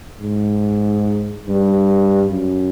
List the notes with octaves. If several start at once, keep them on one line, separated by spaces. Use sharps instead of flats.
G#2
G2
F#2